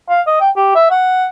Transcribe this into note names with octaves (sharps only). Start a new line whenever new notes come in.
F5
D#5
G5
G4
E5
F#5